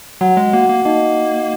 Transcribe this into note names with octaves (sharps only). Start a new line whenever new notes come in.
F#3 F#4 F#5
G#3
A#3 F#4 F#5
A#3
A#3 D#4 D#5